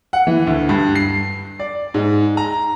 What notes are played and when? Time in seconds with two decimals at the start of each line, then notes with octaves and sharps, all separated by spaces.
0.13 F#5
0.27 E3
0.47 D2
0.69 G2
0.95 C7
1.59 D5
1.94 G#2
2.37 A#5